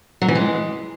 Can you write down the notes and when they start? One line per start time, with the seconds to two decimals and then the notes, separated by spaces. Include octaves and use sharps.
0.22 F#3
0.28 E3
0.35 G#3